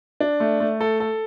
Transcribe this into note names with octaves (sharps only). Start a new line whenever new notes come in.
D4
A3
A3
A4
A4